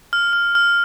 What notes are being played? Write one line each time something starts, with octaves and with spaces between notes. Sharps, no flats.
F6
F6
F6